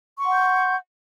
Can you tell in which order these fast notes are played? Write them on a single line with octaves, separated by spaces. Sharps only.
C#6 C6 F#5 G6